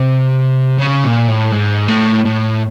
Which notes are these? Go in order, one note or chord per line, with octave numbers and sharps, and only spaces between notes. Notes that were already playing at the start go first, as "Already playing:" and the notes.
Already playing: C3
C#3
A#2
A2
G#2
A2
A2